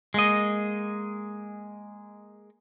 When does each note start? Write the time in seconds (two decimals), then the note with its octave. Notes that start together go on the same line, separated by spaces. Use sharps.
0.14 G#3 A#3 D#5